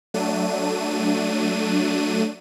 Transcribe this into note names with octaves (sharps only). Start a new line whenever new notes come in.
F#3 A3 D4 D#7